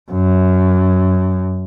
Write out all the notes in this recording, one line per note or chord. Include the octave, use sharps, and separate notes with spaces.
F#2